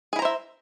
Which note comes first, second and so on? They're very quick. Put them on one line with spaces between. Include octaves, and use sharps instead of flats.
G#4 E4 A#5 C5 E5